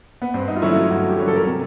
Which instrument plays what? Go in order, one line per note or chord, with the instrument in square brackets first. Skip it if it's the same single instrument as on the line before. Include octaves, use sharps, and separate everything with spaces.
[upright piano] B3
[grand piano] G2 [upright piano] C4
[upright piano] D#4
F4
[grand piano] D3 F#3 A3 C#4 [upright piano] E4
[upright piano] F4
[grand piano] G2 [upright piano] F#4
[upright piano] G4
[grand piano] D3 F#3 A3 C#4
[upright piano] A4
A#4
[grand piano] C3 [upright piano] A4